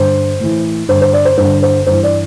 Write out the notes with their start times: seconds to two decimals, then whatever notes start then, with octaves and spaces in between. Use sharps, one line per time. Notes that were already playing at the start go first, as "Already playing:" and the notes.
Already playing: G2 D3 C5
0.40 A2 E3
0.88 G2 D3 C5
1.02 C5
1.13 D5
1.25 C5
1.37 G2 D3 C5
1.62 C5
1.87 G2 E3 C5
2.04 D5